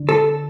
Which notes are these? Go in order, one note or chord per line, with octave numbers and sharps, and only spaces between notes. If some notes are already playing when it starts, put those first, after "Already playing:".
Already playing: D3
A4